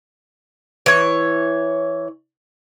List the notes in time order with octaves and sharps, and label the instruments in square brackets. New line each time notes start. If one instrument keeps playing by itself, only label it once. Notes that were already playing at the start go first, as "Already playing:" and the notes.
[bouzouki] E3 C#5